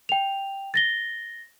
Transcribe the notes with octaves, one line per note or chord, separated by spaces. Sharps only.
G5 F7
A6 A#6 G7